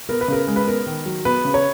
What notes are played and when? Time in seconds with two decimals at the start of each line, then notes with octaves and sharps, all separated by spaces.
0.09 B3 A#4
0.21 B4
0.28 C#3 A#4
0.47 G#3
0.56 B4
0.67 B3 A#4
0.86 D#3
1.06 F#3
1.25 B3 B4
1.45 C#3
1.54 C#5